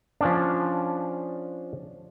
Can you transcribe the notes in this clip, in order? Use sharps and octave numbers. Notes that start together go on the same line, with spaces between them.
F3 C#4 D4